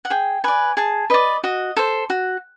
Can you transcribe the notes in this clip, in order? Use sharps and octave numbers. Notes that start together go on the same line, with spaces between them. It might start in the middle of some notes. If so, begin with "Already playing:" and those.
F#5
G#4 G5
B4 D5 G#5
G#4 A5
B4 D5 D#5
F#4 D#5
A4 C5
F#4